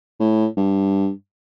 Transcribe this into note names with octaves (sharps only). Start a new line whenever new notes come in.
A2
G2